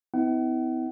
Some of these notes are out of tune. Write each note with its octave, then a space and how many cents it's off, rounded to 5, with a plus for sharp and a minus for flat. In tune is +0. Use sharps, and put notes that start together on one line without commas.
B3 +45 E4 -35 F#5 +35